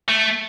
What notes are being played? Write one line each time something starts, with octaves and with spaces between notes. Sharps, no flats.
A3